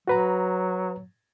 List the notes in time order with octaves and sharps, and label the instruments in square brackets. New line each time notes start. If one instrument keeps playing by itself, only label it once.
[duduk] F#3 [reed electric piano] F#4 B4 A#5